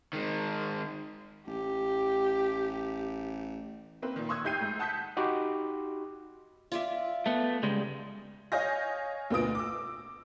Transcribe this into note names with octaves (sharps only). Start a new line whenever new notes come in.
D#3 G#3
A1 G4
A#3 C4 B4
A#2 D#3
C6 C#6 D#6 E6 F#6 G#6
A2 D#4 G4 G6 C7 D#7
G#2
F#5 A5 D#6 G6 B6
D#4 F#4 G4 B5 C6 D6
F4 D5 E5
A3 B3
C#3 G3 G#3
C#5 D#5 F5 G#5 G6 A#6
D2 B2 B3 F4 D#6 D7
D6 E6